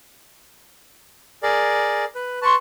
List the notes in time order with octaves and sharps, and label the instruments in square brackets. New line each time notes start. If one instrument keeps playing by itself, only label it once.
[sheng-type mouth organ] G#4 A#4 D5
B4
[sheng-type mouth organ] B4 A5 [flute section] C6 C#6